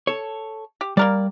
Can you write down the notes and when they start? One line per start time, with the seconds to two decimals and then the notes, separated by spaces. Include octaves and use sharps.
0.07 A4 C#5
0.81 G4
0.97 G3 A#3 A#4 D5